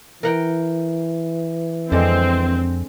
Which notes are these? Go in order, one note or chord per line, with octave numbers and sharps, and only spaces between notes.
E3 A#4 F#5 G5
F2 D3 G#3 C4